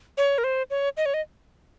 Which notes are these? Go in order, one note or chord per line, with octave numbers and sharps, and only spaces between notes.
C#5
A#4
C5
C#5
D#5
C#5
D#5